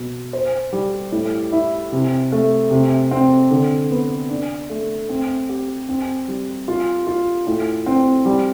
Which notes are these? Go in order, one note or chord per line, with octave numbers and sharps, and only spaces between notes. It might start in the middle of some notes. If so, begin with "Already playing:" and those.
Already playing: B2 B3
C5
G3
A2
E4
C3
A3
C3
C4
D3
B3
D4
A3
C4
G4
C4
G3
F4
F4
A2
C4
G3